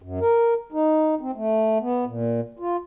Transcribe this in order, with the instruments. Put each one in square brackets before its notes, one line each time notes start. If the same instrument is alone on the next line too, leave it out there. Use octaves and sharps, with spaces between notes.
[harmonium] F#2
A#4
D#4
C4
A3
B3
A#2
F4